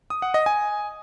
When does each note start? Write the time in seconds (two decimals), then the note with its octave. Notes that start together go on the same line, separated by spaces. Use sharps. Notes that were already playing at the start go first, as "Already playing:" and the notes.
0.10 D#6
0.22 F#5
0.34 D#5
0.46 G#5